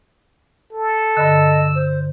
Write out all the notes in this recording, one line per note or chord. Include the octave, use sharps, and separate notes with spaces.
A4
G2 D3 D#5 E6
C5